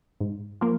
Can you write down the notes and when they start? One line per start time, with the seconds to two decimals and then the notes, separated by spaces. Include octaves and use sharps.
0.20 G#2
0.61 F3 A#3